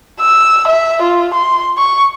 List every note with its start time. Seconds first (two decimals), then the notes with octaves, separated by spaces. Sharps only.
0.21 E6
0.68 E5
1.02 F4
1.34 C6
1.78 C#6